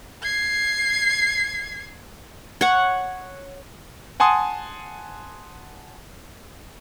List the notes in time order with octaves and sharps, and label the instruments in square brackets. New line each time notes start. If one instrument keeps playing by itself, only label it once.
[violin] G#6 C7
[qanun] C#5 F#5
[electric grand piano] F#5 G#5 A5 C6 D#6